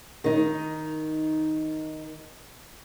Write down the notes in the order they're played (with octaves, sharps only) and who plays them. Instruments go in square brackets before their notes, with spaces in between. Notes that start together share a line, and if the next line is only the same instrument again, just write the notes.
[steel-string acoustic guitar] D#3 D#4